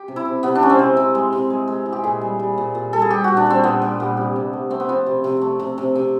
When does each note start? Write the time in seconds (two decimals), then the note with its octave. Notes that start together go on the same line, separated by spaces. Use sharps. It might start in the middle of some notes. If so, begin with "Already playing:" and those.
Already playing: G4
0.08 C3
0.16 E4
0.25 C3
0.43 C3 B3
0.55 D4
0.62 G#3 C#4
0.70 C4
0.79 C3
0.97 C3
1.15 G#3
1.33 C3
1.50 G#3
1.67 G#3
1.86 E3
1.93 G4
2.04 A#2 G#4
2.21 G3
2.39 G3
2.58 A#2
2.75 A#2
2.93 G3 A4
3.02 G#4
3.10 G3 G4
3.24 A#2 F#4
3.37 D4
3.46 G3 C4
3.63 A#2 B3
3.82 G3
4.00 A#2
4.17 C3
4.36 C3
4.53 A3
4.70 A3 C4
4.80 B3
4.89 F3 C4
5.06 C3
5.24 C3
5.41 A3
5.59 C3
5.78 C3
5.95 C3